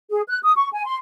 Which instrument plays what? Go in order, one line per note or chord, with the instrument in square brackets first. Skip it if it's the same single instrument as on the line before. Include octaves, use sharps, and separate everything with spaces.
[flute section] G#4
F#6
D#6
C#6
G#5
C6